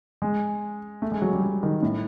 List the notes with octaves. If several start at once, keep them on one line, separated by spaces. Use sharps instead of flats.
G#3
A3
G#3
F#3
G3
F#3
D#3
A2